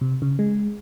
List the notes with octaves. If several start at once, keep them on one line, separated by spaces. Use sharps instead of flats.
C3
C#3
G#3